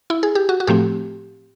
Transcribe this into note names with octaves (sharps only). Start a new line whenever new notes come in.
E4
G#4
G4
F#4
F#4
A2 F3 A3 C4 G4